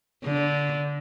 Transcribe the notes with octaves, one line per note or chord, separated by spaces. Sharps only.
D3